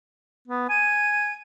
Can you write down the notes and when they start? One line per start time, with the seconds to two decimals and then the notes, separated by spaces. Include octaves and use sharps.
0.48 B3
0.70 G#5 D#7